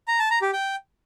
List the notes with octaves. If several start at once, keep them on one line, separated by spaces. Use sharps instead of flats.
A#5
A5
A#5
G4
G5